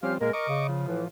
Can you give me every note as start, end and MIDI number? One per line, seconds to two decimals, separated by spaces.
0.03 0.18 53
0.03 0.18 55
0.03 0.18 60
0.03 0.14 61
0.03 0.14 67
0.03 0.14 77
0.21 0.31 46
0.21 0.33 56
0.21 0.31 58
0.21 0.33 70
0.33 0.45 70
0.33 0.67 75
0.33 0.67 85
0.33 0.67 86
0.48 0.87 49
0.69 1.08 53
0.87 1.04 45
0.87 1.04 52